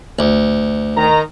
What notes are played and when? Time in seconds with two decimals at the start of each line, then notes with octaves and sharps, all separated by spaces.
0.19 D2
0.97 D#3 A#5